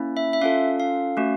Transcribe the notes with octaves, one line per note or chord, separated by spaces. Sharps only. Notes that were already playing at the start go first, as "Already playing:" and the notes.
Already playing: A#3 C#4 E4
E5
E5
C#4 F4 A4 F5
F5
A3 C#4 F#4